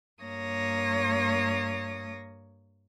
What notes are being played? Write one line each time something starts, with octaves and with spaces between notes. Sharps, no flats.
G2 A#3 C#5 D#6 A#6